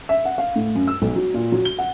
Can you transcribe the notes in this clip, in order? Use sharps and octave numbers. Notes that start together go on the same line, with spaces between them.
E5
F#5
F5
A2
F#2
E6
B1
F#3
A#2
F#3
G7
F#5